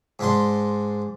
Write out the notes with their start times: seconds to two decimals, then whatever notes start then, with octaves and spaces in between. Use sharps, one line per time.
0.19 G#2 D4 C6